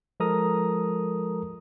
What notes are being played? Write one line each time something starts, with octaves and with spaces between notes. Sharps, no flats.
F3 G#3 A4 A#4 A#5 D#6